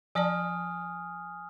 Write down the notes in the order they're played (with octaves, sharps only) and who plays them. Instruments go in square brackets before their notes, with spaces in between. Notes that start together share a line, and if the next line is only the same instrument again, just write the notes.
[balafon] F3 D5 A5 [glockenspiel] G#5 D#6 F6